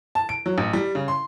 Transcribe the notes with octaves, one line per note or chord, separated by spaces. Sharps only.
A5
D7
F#3
A1
G3
C#3
C6